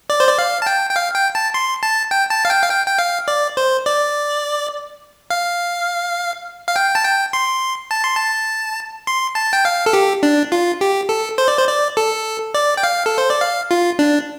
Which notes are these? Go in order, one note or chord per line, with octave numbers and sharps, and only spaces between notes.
D5
C5
D5
F5
A5
G5
G5
F5
G5
A5
C6
A5
G5
A5
F5
G5
F5
G5
G5
F5
D5
C5
D5
F5
F5
G5
A5
G5
C6
A5
C6
A5
C6
A5
G5
F5
A4
G4
D4
F4
G4
A4
C5
D5
C5
D5
A4
D5
G5
F5
A4
C5
D5
F5
F4
D4